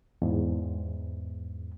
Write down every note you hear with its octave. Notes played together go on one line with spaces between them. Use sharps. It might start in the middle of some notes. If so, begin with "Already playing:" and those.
E2 G#2